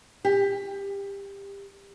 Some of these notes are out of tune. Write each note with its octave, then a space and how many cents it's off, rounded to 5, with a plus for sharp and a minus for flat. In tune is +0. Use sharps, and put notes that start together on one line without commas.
G4 +20